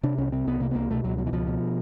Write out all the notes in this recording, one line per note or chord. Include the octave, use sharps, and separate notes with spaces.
C3 D4
C2 C#4
C3 C4
C2 B3
C3 A#3
B3
C2 A#3
B2 A3
C#2 F#3
B2 F#3
E3
C#2 F3
B2